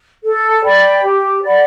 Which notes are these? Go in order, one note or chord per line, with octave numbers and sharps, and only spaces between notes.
A4
D5 G5 B5
G4
D5 F#5 B5